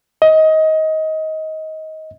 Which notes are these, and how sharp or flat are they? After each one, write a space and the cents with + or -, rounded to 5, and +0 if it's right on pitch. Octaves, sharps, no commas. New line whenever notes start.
D#5 +20